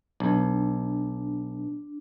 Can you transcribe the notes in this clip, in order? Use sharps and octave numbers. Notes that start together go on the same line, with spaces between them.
B1 D4